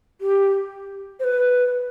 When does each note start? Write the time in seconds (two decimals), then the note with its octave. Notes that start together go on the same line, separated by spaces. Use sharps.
0.21 G4
1.20 C5
1.24 B4